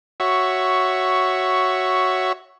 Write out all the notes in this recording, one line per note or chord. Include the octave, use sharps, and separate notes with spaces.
F#4 C#5 E5